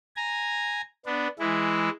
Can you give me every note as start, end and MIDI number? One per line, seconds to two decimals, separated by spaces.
0.16 0.82 80
0.16 0.82 82
1.06 1.28 59
1.06 1.28 62
1.39 1.90 52
1.39 1.90 56
1.39 1.90 64